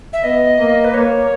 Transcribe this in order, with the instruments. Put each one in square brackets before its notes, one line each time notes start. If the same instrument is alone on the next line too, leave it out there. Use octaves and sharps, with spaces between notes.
[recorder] E5
[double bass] B3 [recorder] D#5
[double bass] A#3
[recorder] B4
[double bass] A#3 [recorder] C#5